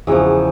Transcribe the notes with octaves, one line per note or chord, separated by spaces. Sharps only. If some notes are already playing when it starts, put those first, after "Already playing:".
E2 C#3 F3 F#4